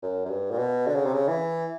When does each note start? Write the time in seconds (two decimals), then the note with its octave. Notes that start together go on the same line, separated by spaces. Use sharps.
0.02 F#2
0.25 F#2
0.30 G2
0.51 A#2
0.58 B2
0.87 D3
0.95 C#3
1.05 C3
1.13 C#3
1.28 E3